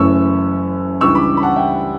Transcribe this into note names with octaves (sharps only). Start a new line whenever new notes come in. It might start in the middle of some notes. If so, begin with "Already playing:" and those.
Already playing: F#1 F#2 E3 A3 C#4 C#6 E6
C#2 C#3 E3 G3 D4 C#6 E6
B5 D6
B5
F#5 A5
E5 G5